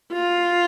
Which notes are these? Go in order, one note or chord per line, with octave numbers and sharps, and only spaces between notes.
F4